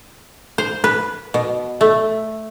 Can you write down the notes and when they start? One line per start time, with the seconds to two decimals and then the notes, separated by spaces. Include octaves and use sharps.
0.58 C5
0.84 B4
1.34 B2
1.81 A3